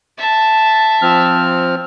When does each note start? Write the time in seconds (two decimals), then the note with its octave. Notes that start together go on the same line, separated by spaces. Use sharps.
0.18 E5 A5
1.02 F3 C4 F6